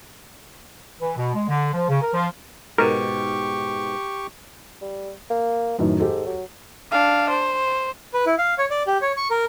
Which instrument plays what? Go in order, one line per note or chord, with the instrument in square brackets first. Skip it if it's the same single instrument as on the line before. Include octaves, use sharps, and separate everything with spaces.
[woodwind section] E3
B2
G#3
D3
F3
C#3
A#4
F3
[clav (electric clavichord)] G#2 B2 [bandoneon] G4 C#6 [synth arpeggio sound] A#4
[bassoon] G3
A#3
[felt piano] F#2 A2 D#3 [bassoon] E3
[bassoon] G#2 [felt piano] G4 A4
[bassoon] F#3
[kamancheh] D4 F5
C5
[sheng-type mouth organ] B4
E4
F5
C#5
D5
G4
C#5
C#6
A#4